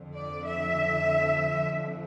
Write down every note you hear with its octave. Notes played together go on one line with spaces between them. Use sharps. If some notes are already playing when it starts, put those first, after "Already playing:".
Already playing: F2 D3 F3
D5
E5